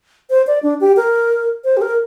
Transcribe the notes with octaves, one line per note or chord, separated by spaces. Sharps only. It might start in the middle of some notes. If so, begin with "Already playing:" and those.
C5
D5
D4
G4
A#4
C5
G4
A#4